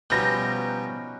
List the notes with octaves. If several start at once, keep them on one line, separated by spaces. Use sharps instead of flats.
B2 F3 G3 C#4 D#4 B4 G6 A#6